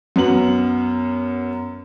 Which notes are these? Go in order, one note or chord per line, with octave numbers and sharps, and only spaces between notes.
F#2 B3 F#4 F#7